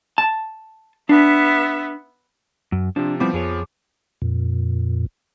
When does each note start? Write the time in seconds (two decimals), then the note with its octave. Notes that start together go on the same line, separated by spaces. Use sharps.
0.18 A5
1.09 B3 D4 E5
2.72 F#2
2.96 C3 F3 D4
3.20 F3 G3 B3 C4 E4 D6
3.33 F2 G#4 C#5
4.22 F2 A#2